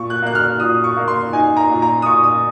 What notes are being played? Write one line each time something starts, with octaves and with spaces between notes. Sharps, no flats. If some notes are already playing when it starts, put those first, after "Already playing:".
Already playing: A#2 C#6
F#6
A#3 F#6
F6
A#2 D#6
C#6
A#3
C6
D#4 G#5
A#5
A#2
A#5
D#6
A#2 C#6
D#6